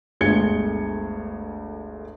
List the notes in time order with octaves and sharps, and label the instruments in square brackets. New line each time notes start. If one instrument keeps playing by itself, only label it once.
[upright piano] G1 D2 G#3 G#6 C#7 G7